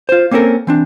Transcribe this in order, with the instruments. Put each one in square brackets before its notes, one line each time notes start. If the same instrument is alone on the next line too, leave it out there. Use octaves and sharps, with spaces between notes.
[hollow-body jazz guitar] F4 C5
A#3 C4 C#4 A4 A#4
E3 C4 D4